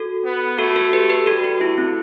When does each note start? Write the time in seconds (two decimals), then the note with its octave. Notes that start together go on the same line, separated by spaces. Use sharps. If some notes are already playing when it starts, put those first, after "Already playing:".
Already playing: F#4 A4
0.24 B3
0.58 A3 F#4 A4
0.76 F#4 A4
0.93 G4 B4
1.09 G4 B4
1.26 G3 F#4 A4
1.44 F#4
1.61 A3 E4
1.78 C4